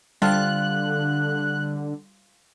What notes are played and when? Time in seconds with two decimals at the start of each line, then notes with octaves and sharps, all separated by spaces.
0.22 D3 G3 C4 D4 F4 F#6